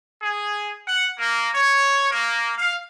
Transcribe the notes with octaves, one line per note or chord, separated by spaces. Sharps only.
G#4
F#5
A#3
C#5
A#3
F5